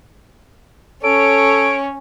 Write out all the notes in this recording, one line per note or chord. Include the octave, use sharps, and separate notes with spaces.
C#4 A4 C#5 D7